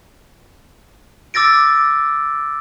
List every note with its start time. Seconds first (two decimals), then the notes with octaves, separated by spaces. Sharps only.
1.34 D6 E6 A6 A#6 D7